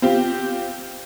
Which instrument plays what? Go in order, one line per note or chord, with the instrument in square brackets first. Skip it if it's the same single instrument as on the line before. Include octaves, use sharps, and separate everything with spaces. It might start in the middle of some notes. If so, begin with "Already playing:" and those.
[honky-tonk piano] C4 F4 G4